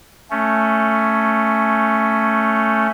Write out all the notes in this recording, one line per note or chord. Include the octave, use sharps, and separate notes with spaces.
A3 C#4